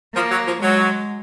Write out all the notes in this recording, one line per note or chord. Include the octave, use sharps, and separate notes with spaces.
F3 A#3
F#3
F3
F#3 G#3